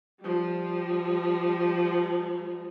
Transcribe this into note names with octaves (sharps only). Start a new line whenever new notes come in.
F3 G3